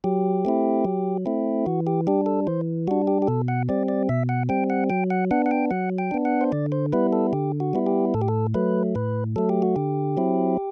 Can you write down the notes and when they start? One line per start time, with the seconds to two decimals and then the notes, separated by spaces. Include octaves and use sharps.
0.04 F#3 G4
0.45 A3 C4 E4
0.85 F#3
1.26 A3 C4 E4
1.66 E3 F#4
1.87 G4
2.07 G3 D4 G4
2.26 A4
2.47 E3 C5
2.87 G3 D4 F#4
3.07 G4
3.22 G4
3.27 B2 A4
3.48 F#5
3.69 G3 C4 D5
3.88 D5
4.09 B2 E5
4.29 F#5
4.49 G3 C4 G5
4.70 F#5
4.90 F#3 G5
5.10 F#5
5.31 B3 D4 F#5
5.46 F#5
5.51 G5
5.71 F#3 F#5
5.98 G5
6.11 B3 D4
6.25 F#5
6.41 C5
6.52 D3 D5
6.72 C5
6.93 G3 B3 E4 B4
7.13 A4
7.33 D3 G4
7.60 F#4
7.73 G3 B3 E4
7.87 G4
8.14 A2 A4
8.22 G4
8.28 A4
8.54 F#3 A3 B4
8.95 A2 B4
9.36 F#3 A3 A4
9.49 G4
9.62 F#4
9.76 D3 G4
10.17 F#3 C4 E4